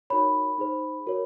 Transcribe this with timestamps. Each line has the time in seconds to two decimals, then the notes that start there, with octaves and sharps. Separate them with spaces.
0.10 D#4 F#4 A#4 C#5 B5
0.58 D#4 G#4 C5
1.06 F#4 A#4 C#5